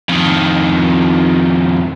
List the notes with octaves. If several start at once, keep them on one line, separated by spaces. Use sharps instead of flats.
F2 D#3